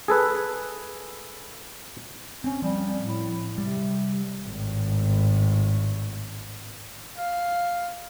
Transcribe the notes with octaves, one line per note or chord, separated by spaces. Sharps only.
G#4 A4 B4
C4 C#4
F3 G3 C4
A2
C3 G3
G#1 A2
F5